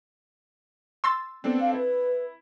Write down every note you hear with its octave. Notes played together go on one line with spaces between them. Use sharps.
C6 E6 A6
B3 C4 D4 A4
F5
E4 B4